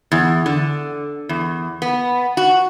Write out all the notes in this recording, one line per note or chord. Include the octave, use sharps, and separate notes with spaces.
E2
D3
E2
B3
F#4